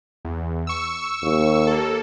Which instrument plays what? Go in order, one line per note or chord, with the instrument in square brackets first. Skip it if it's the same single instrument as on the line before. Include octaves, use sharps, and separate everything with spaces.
[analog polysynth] E2
C#6 E6
[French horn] D#2
[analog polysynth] A#3 A4